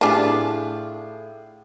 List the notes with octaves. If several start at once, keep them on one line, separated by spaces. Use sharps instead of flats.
A2 D4 F4 G4 G#4 G#5 A5 D6